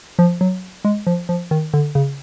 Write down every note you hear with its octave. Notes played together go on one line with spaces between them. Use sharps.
F3
F#3
G#3
F3
F3
D#3
D3
C#3